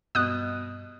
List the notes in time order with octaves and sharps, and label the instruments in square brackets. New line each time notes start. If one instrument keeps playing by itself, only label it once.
[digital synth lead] G2 [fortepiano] B2 [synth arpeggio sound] D#6 F#6